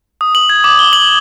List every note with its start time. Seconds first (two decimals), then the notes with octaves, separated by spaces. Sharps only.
0.21 D#6
0.35 F#7
0.50 G#6
0.64 D6
0.79 G7
0.93 F#7